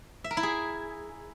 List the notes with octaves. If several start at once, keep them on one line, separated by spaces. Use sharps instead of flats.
E5
A#4
E4
G#4